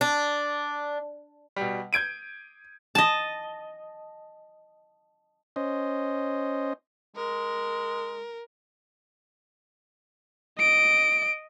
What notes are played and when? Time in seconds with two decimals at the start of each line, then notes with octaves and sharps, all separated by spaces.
0.01 D4
1.56 B2 G3
1.93 G6 G#6 D7 D#7
2.95 D#5 A5
5.56 C#4 C5 D#5
7.16 G#3 A#4
10.59 D#5 D7